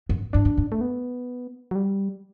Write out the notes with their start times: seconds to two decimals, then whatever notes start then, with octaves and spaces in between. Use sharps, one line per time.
0.09 F#2
0.33 G2 D4
0.45 G2
0.57 F#2
0.72 A3
0.81 B3
1.71 F#3
1.75 G3